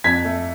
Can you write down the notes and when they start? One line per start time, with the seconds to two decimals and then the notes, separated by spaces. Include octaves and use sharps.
0.04 F2 G#6 B6
0.25 A3